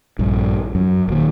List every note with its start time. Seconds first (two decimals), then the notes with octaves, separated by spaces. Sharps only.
0.19 A#1 G2
0.75 F#2
1.08 D#1 D#2